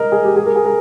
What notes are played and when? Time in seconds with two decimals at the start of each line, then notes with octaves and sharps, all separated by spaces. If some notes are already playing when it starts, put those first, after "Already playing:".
Already playing: A#4 D#5
0.12 G#4
0.24 G4
0.36 G#4
0.46 A#4
0.56 G#4
0.65 A#4